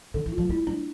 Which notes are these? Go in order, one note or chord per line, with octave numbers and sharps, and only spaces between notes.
D3 A4
E3
F4
F3
G3 E4
G3 D4